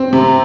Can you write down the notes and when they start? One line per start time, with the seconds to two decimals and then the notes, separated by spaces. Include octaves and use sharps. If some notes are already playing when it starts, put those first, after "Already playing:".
Already playing: C4
0.13 C3